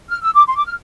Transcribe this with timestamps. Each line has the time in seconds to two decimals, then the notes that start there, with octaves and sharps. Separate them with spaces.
0.09 F6
0.22 E6
0.35 D6
0.47 C6
0.57 D6
0.66 F6